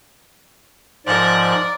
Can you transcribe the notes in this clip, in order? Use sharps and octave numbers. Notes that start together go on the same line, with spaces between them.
G#2 F3 A#4 D5 F#6